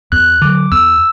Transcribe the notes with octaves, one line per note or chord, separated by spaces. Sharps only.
E2 F#6
D3 F#3 D6
E2 E6